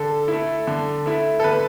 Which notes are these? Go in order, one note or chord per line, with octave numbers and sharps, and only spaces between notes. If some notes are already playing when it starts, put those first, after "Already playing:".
Already playing: D3 A4
A3 E4
D3
A3 E4
A4
D3 B4